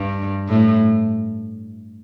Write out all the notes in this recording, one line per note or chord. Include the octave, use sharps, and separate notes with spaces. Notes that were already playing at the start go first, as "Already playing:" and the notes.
Already playing: G2
A2